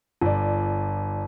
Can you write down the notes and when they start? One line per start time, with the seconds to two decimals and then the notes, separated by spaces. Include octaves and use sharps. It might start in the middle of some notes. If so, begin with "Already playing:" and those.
0.21 G1 D5